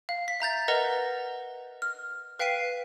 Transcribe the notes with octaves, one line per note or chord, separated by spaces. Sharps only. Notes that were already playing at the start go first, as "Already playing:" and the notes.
F5
B6
E5 A#5 G6 A6
A#4 B4 D#5 F#5 A#5
F6
B4 F5 G5 B6 C7 D#7